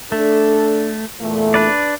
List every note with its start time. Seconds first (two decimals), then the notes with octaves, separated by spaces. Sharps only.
0.12 A3 D4 A4
1.21 E2 A#2 A3
1.54 D4 B4 D5